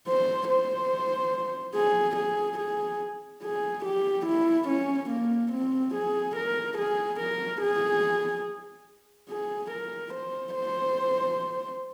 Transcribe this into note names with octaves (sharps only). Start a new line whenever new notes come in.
C5
C5
G#4
G#4
G#4
G#4
G4
E4
C#4
A#3
C4
G#4
A#4
G#4
A#4
G#4
G#4
A#4
C5
C5